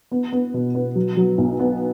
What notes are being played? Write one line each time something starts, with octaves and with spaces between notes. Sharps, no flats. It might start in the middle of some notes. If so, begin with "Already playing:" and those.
B3
B3
B2
B3
F#3
F#3
B1
B3